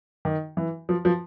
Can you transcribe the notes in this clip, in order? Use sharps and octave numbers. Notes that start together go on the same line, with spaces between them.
D#3
E3
F3
F3